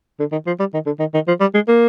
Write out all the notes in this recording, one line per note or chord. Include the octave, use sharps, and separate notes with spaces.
D3
D#3
F3
G3
D#3
D3
D#3
D#3
F3
G3
G#3
A#3